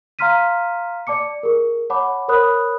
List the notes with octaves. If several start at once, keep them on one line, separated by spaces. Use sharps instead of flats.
F5 A#5 C6 F6 B6 D#7
D5 A5 D6 C#7
G#4 A#4
C#5 F#5 A5 B5 D6
A#4 C5 C#5 B5 D#6 F#6